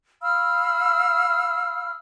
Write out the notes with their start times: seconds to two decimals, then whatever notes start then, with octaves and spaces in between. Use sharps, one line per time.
0.22 F5 B5 E6 F6